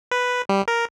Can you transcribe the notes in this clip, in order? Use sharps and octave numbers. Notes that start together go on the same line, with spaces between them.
B4
G3
A#4